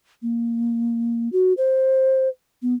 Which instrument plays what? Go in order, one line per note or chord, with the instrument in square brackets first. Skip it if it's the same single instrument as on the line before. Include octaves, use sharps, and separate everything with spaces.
[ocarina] A#3
F#4
C5
B3